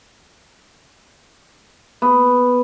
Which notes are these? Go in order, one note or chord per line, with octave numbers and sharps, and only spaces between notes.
B3